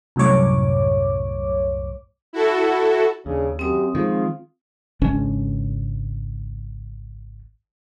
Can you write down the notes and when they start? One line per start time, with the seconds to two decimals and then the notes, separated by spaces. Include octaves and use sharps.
0.16 C2 F#2 A2 C#5 D6
2.33 E4 F#4 A4
3.26 D#2 C#3 D4
3.59 F#2 C4 G4 D#6
3.95 D#3 F3 G#3 F4
5.01 G#1 C#2 C#4 D4